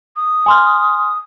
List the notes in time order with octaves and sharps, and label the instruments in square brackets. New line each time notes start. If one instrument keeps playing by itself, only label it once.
[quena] D#6
[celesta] G#5 C6 F6